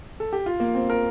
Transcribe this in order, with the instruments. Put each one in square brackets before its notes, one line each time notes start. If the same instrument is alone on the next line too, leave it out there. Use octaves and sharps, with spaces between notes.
[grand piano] A4
G4
F4
A#3
C4
A#4